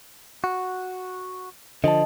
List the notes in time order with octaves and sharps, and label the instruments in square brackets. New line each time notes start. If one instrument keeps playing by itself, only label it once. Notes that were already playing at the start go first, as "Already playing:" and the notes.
[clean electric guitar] F#4
[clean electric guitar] D3 F3 [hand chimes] D#5 A5